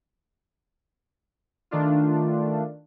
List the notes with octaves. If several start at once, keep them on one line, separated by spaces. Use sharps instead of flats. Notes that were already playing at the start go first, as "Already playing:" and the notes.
D#3 A3 D4 F4